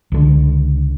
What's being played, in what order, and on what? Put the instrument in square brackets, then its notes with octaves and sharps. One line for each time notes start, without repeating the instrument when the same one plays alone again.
[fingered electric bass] C#2 D3